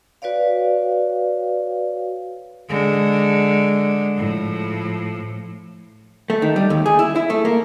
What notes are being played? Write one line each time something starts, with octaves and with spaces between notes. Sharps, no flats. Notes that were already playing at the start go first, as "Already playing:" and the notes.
F#4 B4 C#5 D5 F5
D3 G#3
A2 F3
A3
D#3
G3
D#2
G#4
E4
E4
A3
A#3